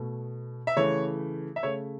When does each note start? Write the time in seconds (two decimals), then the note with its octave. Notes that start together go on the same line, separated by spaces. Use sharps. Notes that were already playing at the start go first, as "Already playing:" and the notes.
Already playing: B2 A3
0.67 E5
0.76 C#3 E3 A3 C#5
1.56 E5
1.63 C#3 A3 C#5